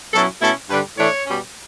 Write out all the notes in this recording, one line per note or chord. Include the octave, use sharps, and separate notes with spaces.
B2 F#3 C#4 E4 A4
B2 A3 C#4 E4 A4
G2 D3 G3 D4 B4
A2 E3 A3 D4 C#5
B2 G3 C#4